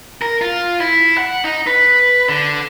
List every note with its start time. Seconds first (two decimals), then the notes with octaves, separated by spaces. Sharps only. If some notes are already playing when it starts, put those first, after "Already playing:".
0.22 A#4
0.42 F4
0.81 E4
1.18 F#5
1.44 D#4
1.67 B4
2.29 D3